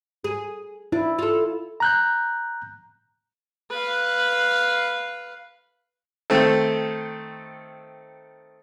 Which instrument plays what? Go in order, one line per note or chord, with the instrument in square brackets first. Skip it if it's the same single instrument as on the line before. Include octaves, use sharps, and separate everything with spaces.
[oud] G#4
[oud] D4 [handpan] E4
[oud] F4 A4
[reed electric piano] A#5 F#6 G6
[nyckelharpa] B4 F5
[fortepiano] D#3 A3 C4 A4